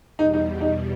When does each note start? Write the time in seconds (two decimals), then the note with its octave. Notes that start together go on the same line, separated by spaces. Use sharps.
0.19 E2 B2 G3 D#4
0.34 D#4
0.61 D#4